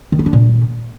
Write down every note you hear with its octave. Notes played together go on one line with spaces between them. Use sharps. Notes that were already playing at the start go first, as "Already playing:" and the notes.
D#3
B3
D4
A#2